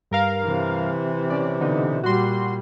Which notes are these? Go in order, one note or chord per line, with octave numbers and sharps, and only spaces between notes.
G2 A#4 F5
C3 E3
C#4 D5
B2 D3 D#4
A#2 G3 F#4 C6